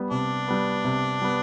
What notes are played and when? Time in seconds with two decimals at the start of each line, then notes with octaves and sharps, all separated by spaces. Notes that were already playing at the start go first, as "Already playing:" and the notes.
Already playing: G3 B3
0.11 C3 D4
0.48 G3 B3
0.84 C3
1.22 G3 B3